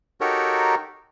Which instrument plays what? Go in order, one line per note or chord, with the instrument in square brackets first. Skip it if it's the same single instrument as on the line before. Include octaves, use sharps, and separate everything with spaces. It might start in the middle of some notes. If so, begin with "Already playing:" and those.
[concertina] D#4 F#4 G4 A4 A#4 C#5